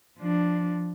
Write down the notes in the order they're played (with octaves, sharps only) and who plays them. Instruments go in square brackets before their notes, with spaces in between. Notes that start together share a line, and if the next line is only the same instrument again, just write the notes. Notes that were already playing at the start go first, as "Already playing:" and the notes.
[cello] F3 D4